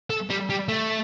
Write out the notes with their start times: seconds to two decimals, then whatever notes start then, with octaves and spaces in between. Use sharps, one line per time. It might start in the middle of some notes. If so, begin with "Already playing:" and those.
0.10 A4
0.30 G3
0.49 G3
0.68 A3